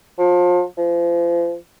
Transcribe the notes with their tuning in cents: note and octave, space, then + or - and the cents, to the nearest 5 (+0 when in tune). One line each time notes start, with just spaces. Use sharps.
F3 +30
F3 -35